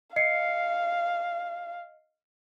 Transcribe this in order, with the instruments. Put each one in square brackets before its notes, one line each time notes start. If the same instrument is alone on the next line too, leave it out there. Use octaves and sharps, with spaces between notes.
[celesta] D#5 C7 C#7 [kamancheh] F5